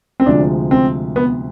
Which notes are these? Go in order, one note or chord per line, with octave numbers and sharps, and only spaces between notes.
C4
D2 C3 F3 G#3 D4
C4
B3